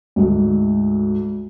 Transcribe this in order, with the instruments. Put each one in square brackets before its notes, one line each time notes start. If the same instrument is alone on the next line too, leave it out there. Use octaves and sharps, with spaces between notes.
[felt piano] D2 G#2